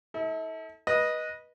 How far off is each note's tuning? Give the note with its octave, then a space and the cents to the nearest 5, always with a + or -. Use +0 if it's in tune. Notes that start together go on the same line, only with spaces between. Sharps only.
E4 -45 A4 +0
B4 -20 D#5 +0